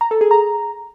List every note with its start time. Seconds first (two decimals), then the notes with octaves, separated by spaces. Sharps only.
0.01 A#5
0.11 A4
0.21 G#4
0.31 A#5